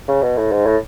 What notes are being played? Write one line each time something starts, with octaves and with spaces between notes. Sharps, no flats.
C#3
B2
A2
G#2
A2